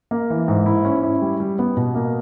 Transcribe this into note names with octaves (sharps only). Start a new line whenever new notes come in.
A#3
E3
G#2
E4
C#4
E4
G3
G3
B3
B2
A#3